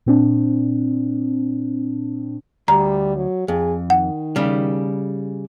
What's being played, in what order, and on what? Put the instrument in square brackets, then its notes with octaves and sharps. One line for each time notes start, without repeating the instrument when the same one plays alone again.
[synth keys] A#2 C4 D4
[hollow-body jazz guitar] D2 [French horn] G3 [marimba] A#5
[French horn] F#3
[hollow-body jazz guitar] F2 [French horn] G#4
[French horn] D#3 [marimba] F#5
[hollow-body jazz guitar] C#3 G3